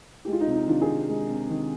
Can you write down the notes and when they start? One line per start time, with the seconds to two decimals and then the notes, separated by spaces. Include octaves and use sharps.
0.25 G#3 G4
0.33 F4
0.41 D#4
0.47 C3
0.54 D#4
0.68 D#3 D4 F4
0.81 F4 G#4
0.88 C3
1.09 G#3
1.29 C3
1.50 D#3